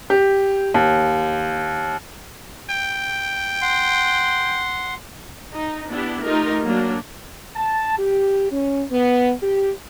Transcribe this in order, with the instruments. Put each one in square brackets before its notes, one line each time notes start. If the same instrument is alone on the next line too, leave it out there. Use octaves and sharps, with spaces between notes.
[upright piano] G4
D#2
[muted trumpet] G5
[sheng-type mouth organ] F#5 C6
[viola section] D#4
B3 D4 E4 G4
A3 D#4 F4 G4 A#4
F#3 A#3 D4
[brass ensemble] A5
G4
C#4
B3
G4